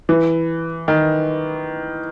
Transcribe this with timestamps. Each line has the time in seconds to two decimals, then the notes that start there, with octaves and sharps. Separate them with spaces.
0.09 E3
0.88 D#3